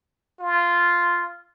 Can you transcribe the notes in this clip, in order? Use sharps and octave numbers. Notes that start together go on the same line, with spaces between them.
F4